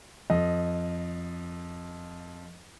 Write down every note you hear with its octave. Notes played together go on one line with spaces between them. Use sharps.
F2 D#5